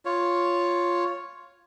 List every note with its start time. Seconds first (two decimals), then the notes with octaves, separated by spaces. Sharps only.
0.05 F4 C#5